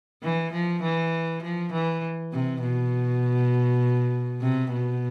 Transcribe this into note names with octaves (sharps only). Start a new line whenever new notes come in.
E3
F3
E3
F3
E3
C3
B2
C3
B2